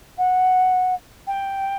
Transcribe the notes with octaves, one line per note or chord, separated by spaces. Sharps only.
F#5
G5